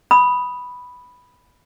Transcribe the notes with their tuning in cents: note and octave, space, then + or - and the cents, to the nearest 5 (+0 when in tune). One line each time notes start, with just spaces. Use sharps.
B5 +0 D#6 +0